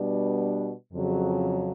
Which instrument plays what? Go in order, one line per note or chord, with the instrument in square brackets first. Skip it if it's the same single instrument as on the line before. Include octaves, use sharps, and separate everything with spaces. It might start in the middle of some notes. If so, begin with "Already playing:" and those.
Already playing: [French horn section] B2 G3 B3 D4
F2 C#3 F#3